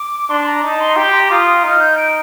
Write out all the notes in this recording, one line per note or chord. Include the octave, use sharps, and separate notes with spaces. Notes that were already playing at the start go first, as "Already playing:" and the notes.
Already playing: D6
D4 C6
C6
A#5
D#4 A5
C6
G4 C6
A#5
F4 D#6
D#6
D#4 F6
G6
D7